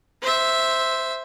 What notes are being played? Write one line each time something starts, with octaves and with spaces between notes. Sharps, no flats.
C5 E5